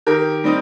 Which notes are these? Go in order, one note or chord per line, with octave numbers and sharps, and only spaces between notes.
D#3 G4 A#4
G3 C4 D#4